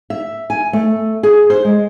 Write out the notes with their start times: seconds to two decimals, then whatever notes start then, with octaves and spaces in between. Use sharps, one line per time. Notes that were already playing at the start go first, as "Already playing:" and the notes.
0.10 E5
0.50 G#5
0.73 A3
1.23 G#4
1.50 C5
1.65 G#3